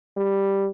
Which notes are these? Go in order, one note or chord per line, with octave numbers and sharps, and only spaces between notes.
G3